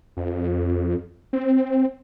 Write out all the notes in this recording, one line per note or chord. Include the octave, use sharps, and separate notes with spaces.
F2
C4